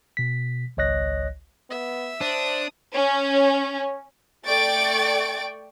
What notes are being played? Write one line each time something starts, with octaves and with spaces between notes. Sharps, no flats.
B2 B6
G#1 C#2 C#5 D#5 F#6 A#6
B3 E5
D4 C5 D#6
C#4
A3 D5 G5 C#6 A6 D7